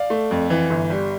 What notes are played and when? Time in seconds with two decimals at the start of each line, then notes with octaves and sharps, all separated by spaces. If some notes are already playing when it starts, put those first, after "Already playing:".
Already playing: D5 F5
0.10 A3
0.31 F2
0.50 E3
0.70 G1
0.90 G3